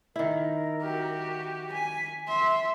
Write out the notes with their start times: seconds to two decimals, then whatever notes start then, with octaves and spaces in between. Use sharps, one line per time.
0.16 D#3 E4 A#4
0.82 F#4 G4
1.72 G#5 B6
2.28 E5 C6